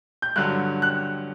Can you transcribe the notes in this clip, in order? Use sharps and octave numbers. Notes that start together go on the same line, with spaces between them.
G6
G2 D3 F#3 F#6
F#6